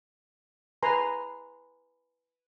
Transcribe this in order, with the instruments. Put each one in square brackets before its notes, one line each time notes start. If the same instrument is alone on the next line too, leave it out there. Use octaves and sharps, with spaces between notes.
[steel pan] B4 G#5 A#5 C6